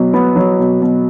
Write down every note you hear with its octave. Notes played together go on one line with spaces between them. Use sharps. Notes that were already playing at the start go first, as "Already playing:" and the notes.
Already playing: B2 F#3
B3
F#3
B2
B2